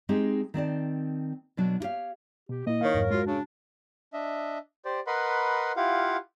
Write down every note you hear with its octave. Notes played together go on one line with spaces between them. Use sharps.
G#3 C4 D#4 G4 G#4
D#3 C4 D5 A5
B2 F#3 D4
E4 G4 C#5 F5
B2 G4
A#2 A#3 E4 D#5
D#3 C#5 F5
F2 G#2 F#3 A#4
G#3 F4 F#4
C#3 D4
D4 D#5 E5
G4 C5 D5
A#4 B4 D#5 F#5 B5 C6
E4 F4 G4 F5 F#5